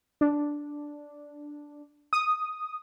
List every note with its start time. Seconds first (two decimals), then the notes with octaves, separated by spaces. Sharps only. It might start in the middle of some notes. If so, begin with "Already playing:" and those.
0.21 D4
2.13 D#6